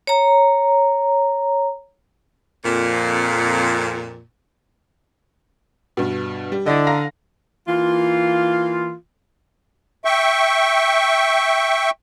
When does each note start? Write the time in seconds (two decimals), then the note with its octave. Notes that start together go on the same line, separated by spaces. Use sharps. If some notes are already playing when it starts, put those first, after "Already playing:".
0.07 C#5 A#5
2.63 F2 A#2
5.97 G2 B2
6.52 G3
6.66 D3 E4 D#5
6.87 F5 A#5 A#6
7.68 E3 A#3 F4
10.05 E5 G5 C#6